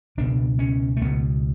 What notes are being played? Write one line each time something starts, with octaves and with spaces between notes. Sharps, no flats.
C#2 B2 D4
C#4
A3
C#2 B2 B3